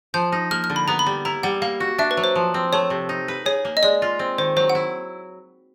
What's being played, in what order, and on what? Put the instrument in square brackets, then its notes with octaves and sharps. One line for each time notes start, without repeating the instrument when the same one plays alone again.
[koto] F3 [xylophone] G6
[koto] D#4
[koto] A#3 [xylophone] F6
[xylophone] F6
[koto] D3
[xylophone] B5
[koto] B3 [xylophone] A#5
[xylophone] B5
[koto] G3
[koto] E4 [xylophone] A#5
[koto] G3 [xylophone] F#5
[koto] A#3 [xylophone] F5
[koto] F#4
[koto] D4 [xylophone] E5
[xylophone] B4
[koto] F#3
[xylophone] C5
[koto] F3
C4
[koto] A3 [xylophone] C#5
[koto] C3
D#4
B4
[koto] G#4 [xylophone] C#5
[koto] A#3
[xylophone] D#5
[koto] G#3 [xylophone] D5
[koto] F4
C4
[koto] D#3 [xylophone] C5
[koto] F#3 [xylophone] C5
[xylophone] F#5
[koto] E4